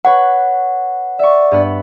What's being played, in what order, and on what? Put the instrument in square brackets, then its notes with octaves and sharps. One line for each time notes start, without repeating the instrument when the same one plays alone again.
[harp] B4 C#5 C#6 [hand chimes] F#5
[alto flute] D5 [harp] E5 C#6
[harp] G2 B3 B4